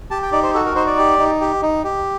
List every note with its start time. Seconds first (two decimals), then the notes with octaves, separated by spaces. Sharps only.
0.11 G4 A5
0.22 G5
0.32 D#4 D5
0.43 C5
0.54 F#4 A4
0.66 A#4
0.75 D#4 C5
0.87 D5
0.98 G4
1.19 D#4
1.41 G4
1.62 D#4
1.84 G4